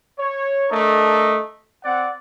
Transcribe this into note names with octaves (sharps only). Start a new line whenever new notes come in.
C#5
A3 D4 A#4 D#5
C4 D5 F#5